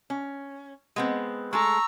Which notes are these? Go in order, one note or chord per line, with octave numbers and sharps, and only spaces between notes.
C#4
G#3 B3 C4
G#3 A3 A4 A#5 C#6 E6